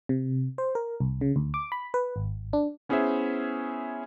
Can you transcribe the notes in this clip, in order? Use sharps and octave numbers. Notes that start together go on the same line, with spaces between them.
C3
C5
A#4
C2
C#3
D2
D6
B5
B4
G#1
D4
B3 C#4 E4 G#4 C5 E5